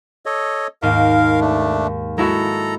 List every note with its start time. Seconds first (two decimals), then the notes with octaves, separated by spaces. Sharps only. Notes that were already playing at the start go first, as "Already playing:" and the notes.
0.26 A4 C#5 D#5
0.82 D#2 G#2 A#4 F5
1.40 A3 D4
2.18 G#3 E4 F#4 A4 A#5